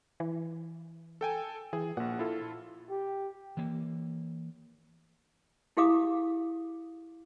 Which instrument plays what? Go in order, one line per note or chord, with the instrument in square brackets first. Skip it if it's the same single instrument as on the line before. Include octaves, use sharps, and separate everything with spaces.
[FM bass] E3
[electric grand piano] A4 G5 G#5
[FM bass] E3 [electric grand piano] G#4
[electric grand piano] A#1 F#5 [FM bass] A#2
[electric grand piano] E4 F4 A4
[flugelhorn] G4
[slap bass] E3 A#3
[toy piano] E4 G4 G#4 F5 D6 D#6